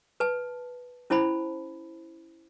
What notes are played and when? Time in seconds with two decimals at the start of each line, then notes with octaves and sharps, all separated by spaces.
0.20 B4 A5
1.10 C#4 E4 C5 A5 B5